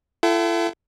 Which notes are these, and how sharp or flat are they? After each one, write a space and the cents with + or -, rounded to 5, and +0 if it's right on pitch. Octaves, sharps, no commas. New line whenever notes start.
E4 +45 A4 +5 G5 -45